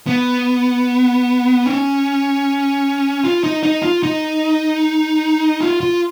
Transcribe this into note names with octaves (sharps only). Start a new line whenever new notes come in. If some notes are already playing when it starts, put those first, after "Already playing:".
B3
C#4
F4
D#4
D#4
F4
D#4
F4
F4